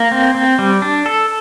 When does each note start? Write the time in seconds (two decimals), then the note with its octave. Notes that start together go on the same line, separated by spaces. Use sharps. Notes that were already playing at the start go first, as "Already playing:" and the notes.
Already playing: A#3
0.12 C4
0.35 C4
0.59 G3
0.82 D4
1.06 A4